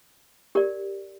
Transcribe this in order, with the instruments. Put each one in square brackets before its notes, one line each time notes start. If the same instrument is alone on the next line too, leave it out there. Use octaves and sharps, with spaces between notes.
[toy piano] G4 A#4 D5